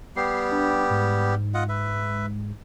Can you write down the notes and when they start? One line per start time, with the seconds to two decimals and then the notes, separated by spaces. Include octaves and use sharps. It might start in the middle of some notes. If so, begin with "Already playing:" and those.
0.16 G3 B3 G4 C7
0.51 D4
0.90 G#2
1.54 F4 D#5 F#5
1.69 B4 E5